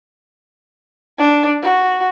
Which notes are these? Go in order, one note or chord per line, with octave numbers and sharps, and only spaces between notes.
D4
F#4